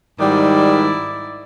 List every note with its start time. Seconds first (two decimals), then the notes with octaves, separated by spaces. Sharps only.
0.19 G#2 D#3 G3 E4 D5